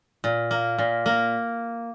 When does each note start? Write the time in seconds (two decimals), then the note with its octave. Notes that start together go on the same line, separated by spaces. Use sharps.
0.24 A#2
0.51 A#3
0.78 A#2
1.06 A#3